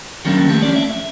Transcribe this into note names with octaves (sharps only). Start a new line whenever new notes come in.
D#3 F#3 G3 A#3 C#4 D4
F3 A3 G4
C#4 D5
E5